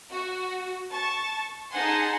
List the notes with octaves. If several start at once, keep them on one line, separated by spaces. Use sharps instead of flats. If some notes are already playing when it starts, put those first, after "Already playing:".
F#4
A5 C#6 A6
D#4 G#4 F#5 G#5 A5 C6